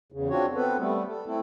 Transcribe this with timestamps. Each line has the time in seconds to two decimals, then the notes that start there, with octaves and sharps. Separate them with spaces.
0.12 E2 C#3
0.30 C4 D4 F4 F#4 C#5
0.55 B3 C4 A4 B4
0.79 G3 A3 B3
1.10 A4
1.26 A3 C4 E4 A4